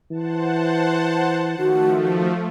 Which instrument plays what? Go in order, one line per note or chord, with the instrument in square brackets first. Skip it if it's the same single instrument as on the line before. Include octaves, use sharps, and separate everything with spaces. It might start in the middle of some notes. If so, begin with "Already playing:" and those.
[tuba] E3 [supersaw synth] C5 F#5 A5
[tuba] D#3 [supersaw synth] F3 A3 [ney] F#4